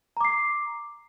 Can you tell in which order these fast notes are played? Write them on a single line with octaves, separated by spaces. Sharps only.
A#5 D6 C7